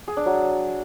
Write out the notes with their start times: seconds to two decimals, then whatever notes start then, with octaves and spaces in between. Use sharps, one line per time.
0.08 G#4
0.17 D4
0.26 F#3